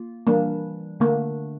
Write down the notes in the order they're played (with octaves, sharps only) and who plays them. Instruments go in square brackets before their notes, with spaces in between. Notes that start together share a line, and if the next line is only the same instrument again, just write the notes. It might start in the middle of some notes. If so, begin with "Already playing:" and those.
Already playing: [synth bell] A#3 F4
[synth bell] E3 G3 D4 [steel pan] A#3
[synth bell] D3 A3 D4 [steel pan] A#3